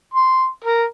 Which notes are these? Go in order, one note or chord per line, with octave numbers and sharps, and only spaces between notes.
C6
A#4